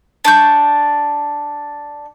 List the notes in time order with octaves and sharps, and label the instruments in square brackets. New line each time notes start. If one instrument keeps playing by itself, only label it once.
[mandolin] D4 C#6 G6